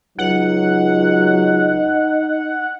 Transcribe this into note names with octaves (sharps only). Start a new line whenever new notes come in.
C#2 F#3 D#4 F#5